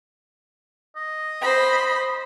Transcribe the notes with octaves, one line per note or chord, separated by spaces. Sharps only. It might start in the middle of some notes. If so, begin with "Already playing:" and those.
D#5
C5 B5